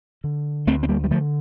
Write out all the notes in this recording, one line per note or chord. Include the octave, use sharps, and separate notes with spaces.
D3
D2 A3 C4
C4
G3 A#3
G3
D3 F3 A3